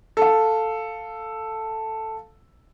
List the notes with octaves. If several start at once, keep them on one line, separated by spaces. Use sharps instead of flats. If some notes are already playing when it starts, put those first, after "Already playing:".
A4 F5